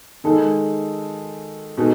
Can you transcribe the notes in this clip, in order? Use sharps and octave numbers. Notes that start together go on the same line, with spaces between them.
D#3 G#3 D#4 A4
B2 G#3 D#4 A4